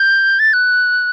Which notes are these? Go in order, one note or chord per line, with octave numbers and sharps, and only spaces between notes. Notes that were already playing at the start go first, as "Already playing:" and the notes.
Already playing: G6
A6
F#6